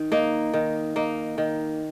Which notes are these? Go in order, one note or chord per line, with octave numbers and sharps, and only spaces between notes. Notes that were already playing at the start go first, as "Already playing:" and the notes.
Already playing: D#3
A#3 D#4
D#3
A#3 D#4
D#3